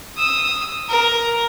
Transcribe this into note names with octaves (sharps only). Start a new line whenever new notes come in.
D#6 E6
A#4